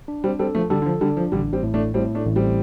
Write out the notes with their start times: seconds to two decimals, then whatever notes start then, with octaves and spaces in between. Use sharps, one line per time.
0.08 D4
0.24 G3 C4
0.39 G3 C4 A4
0.55 F3 A3
0.70 D3 G3 A4
0.82 D3
0.86 F3
1.01 D3 G3 D4
1.17 F3
1.32 A1 D3 G3
1.53 G3 C4
1.63 A2
1.74 A3 D4
1.94 A2 G3 C4
2.15 A3 D4
2.25 A1
2.36 G3 C4